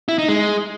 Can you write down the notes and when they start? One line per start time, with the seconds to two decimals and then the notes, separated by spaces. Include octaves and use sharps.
0.08 E4
0.18 D#4
0.29 G#3